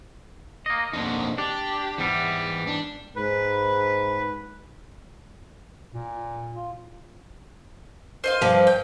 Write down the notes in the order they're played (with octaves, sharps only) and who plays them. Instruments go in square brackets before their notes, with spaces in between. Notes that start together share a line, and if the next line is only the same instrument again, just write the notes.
[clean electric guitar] A#3 D#5
[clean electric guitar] F2 B2 [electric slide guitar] A#3 D4 D#4
[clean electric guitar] D4 [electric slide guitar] G4
[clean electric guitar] G#2 G3 [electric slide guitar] E3 B3
[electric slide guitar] D4
[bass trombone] G#2 [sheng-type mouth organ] B4
[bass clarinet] A#2
F4
[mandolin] C5 D#5 F5
[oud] G2 F3
[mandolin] G5